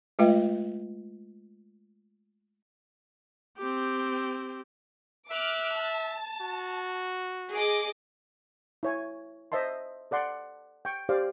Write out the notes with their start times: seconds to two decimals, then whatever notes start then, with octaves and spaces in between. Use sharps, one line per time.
0.19 G#3 A3 F4 B4 D#5 G5
3.58 C4 G4
5.31 E5 D6 F6 F#6
5.78 A5
6.41 F#4
7.51 G#4 D#5 D6
8.83 E4 C#5 G#5
9.52 C5 D#5 E5 A5 C6
10.11 A4 D5 F#5 C6
10.85 G5 C#6
11.09 G4 C5 D5 F5